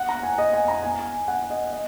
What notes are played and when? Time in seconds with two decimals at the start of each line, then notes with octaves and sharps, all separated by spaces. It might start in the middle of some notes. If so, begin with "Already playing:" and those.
Already playing: F#5
0.09 A#5
0.23 G#5
0.38 D#5
0.53 G#5
0.68 A#5
0.83 G#5
1.28 F#5
1.50 D#5
1.73 D#5